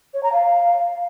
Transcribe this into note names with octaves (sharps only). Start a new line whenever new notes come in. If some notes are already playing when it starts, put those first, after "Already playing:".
C#5
A#5
F5